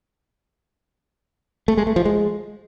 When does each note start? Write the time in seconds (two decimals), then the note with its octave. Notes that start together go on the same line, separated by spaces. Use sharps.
1.68 A3
1.77 G#3
1.87 A3
1.96 F3
2.05 G#3